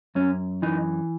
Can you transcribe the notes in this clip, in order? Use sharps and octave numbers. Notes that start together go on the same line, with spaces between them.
F#2 C#4
E3 D#4